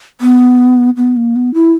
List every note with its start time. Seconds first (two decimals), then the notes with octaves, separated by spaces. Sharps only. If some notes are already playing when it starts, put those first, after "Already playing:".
0.21 B3
0.97 B3
1.17 A#3
1.36 B3
1.54 E4